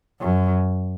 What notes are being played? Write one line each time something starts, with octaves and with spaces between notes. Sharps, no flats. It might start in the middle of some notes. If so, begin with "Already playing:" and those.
F#2